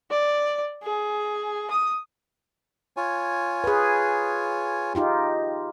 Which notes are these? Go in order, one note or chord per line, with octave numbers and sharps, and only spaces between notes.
D5
G#4
D#6
F4 C#5 G#5
G#4 B4
D#4 F4 G4